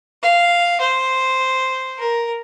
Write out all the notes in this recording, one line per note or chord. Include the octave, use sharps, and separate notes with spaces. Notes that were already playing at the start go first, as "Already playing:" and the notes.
F5
C5
A#4